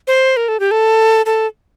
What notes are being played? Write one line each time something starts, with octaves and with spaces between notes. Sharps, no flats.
C5
A#4
A4
G4
A4
A4